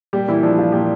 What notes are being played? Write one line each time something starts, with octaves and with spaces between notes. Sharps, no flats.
A#2 G3 G4
A#2 E3 E4
F3 D4
F3 F4
A#2 G4